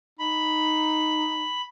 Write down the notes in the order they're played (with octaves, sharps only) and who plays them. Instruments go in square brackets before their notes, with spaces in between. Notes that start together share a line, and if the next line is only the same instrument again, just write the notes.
[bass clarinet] D#4 [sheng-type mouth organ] B5